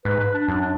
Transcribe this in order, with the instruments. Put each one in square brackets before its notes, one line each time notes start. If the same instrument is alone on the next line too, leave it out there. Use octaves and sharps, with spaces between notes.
[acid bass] G#2 [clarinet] B4
[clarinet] B4
D4
[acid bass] F#2 [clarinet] D4
[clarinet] D4